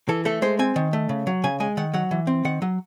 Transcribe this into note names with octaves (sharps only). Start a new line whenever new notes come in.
E3 A4
A3 A4
G#3 C5
C4 G#5
D#3
A3
C#3
F#3
C#3 G#5
G#3 G#5
D#3 F#5
F#3 F#5
E3
C4
D#3 F#5
F#3